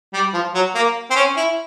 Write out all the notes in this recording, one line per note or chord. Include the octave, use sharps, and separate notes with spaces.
G3
F3
F#3
A#3
C4
C#4
E4